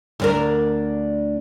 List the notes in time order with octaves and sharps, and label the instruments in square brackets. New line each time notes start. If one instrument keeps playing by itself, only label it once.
[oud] D2 D4 A#4